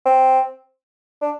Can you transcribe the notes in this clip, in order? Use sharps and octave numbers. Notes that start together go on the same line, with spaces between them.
C4
D4